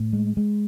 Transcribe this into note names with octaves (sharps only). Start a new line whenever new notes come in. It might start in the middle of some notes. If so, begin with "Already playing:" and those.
Already playing: A2
G#3
G#3